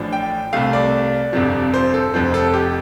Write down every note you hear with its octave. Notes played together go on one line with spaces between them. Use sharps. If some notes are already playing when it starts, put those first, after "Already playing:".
Already playing: A1 A2 F3 D4
G5
C2 C3 A3 F5
D5
G1 F2 C3 F3
C5
A4
F1 F2 F3 C4 C5
A4
G4